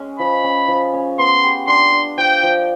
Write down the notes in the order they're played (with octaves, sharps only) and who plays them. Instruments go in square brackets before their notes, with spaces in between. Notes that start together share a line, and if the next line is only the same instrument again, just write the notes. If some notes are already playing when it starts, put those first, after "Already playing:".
Already playing: [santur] G#3 C#4
[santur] F3 [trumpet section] B5
[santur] C#4
F3
C#4
[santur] B3 [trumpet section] C6
[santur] G4
[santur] D4 [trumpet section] C6
[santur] D4
[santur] F3 [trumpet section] G5
[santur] F3